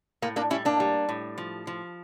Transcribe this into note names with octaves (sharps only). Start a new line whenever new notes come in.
A2 A#3
A#3 D4
G3 C#4 E4
A#3 D4
G3
A2
F3
F3